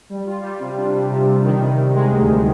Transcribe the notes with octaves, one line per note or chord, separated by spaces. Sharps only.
G3
F4
G3
C3
D4
G3
C3
G3
D#3
C3
C3
G#3
D2